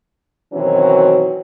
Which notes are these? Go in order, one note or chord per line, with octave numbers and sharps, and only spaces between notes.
B2 D#3 E3 F#3 C4 C#4